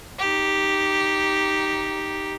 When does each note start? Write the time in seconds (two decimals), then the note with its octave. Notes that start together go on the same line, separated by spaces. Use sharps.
0.19 D#4 G4